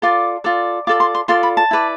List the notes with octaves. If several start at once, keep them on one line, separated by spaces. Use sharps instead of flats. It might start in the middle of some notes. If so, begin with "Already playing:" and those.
F4 A4 D5 D6
F4 A4 D5
F4 A4 D5 D6
C6
C6
F4 A4 D5 C6
B5
A5
E4 B4 D5